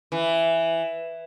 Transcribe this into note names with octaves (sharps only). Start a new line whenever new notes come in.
E3